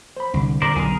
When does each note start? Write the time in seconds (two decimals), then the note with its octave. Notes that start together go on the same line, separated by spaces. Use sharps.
0.17 C5 B5
0.34 C2 D3
0.62 A#2 A#4 C5 D5
0.76 B1 B2 G#4 A#4